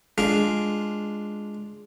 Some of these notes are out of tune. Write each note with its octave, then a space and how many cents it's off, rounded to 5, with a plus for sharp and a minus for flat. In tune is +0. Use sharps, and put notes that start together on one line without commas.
G#3 +0 D4 -5 F4 +0